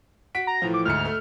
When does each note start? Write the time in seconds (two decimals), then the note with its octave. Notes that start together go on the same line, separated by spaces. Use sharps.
0.35 F#4 B6 D7
0.47 A#5
0.62 A2 E3 F3
0.74 D6
0.85 D2 G#2 F6 C#7
1.05 A3